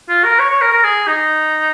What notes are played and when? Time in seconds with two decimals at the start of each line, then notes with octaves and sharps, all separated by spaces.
0.09 F4
0.24 A#4
0.39 C#5
0.50 C#5
0.61 A#4
0.72 A#4
0.84 G#4
1.07 D#4